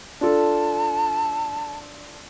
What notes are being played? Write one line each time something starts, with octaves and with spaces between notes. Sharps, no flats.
D4 F4 A4 A5